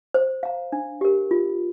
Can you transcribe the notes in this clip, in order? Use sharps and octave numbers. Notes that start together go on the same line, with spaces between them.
C5
F5 A#5
D4
G4 A#4
F4